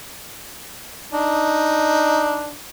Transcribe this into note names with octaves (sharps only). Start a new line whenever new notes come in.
D4 D#4